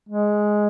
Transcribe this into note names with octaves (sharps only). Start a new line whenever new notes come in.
G#3